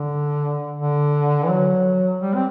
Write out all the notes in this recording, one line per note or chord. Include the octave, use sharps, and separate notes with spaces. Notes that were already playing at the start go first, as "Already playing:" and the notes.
Already playing: D3
D3
E3
F#3
G3
C4